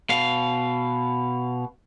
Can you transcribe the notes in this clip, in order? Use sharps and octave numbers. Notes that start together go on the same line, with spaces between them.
B2 F5